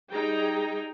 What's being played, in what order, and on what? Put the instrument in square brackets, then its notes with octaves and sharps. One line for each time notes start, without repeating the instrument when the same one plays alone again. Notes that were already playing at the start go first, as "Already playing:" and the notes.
[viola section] G3 D#4 G#4 G5 A#5